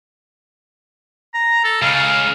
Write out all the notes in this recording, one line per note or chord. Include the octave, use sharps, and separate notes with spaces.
A#5
A4
C#2 C#3 F5